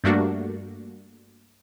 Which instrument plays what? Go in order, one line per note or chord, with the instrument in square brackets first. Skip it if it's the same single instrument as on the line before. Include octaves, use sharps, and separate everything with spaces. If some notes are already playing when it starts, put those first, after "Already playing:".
[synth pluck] G2 G3 A3 A#3 D4 F#4